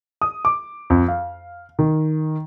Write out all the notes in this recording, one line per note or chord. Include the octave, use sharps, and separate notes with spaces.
D#6
D6
F2
F5
D#3